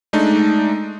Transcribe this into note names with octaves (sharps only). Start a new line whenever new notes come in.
G#3 A3 D4 D#4